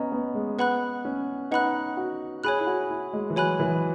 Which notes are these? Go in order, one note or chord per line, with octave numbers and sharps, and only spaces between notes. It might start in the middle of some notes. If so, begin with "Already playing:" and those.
Already playing: B3 C#4 D#5 A#5
B3
G#3
B3 B4 F#5 B5 F#6
C#4
D#4 B4 F#5 B5 F#6
F#4
G#4 C#5 G#5 B5 F#6
E4
F#4
E4
G#3
E3
F#3 C#5 G#5 B5 F#6
E3